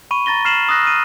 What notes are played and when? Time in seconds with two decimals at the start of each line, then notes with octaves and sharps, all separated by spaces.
0.11 B5 C#6 D#7
0.26 A#5 A6 A#6 G7
0.45 F6 C7 E7 F#7
0.69 D#6 E6 F#6 A#6
0.83 F6 D#7